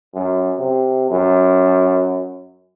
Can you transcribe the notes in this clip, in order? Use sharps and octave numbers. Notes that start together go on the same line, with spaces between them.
F#2
C3
F#2